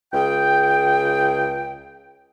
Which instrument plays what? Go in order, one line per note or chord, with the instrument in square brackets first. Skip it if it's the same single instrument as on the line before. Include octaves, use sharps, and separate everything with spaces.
[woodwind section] C#2 G#4 G5